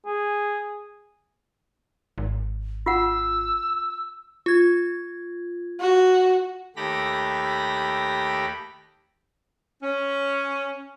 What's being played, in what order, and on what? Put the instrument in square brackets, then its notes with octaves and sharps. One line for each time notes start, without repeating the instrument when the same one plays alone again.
[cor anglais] G#4
[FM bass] G#1
[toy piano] F4 F#5 [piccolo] E6
[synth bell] F4 G#6
[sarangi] F#4
[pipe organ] D#2 A3 G4 B5 A#6
[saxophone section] C#4